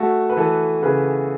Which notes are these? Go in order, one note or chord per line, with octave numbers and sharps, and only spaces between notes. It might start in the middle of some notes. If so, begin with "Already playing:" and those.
Already playing: A3 F#4
B4
E3 A4
C#3 B4